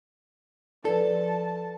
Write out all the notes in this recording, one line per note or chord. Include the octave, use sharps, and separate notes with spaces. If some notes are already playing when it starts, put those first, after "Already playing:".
F3 A4 B4 D5 A5